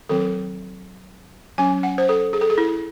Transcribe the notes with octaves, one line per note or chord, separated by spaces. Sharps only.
D#3 F#3 C4 A4
F#3 C#4 G#5
F#5
C5
A4
G#4
A4
G#4
E4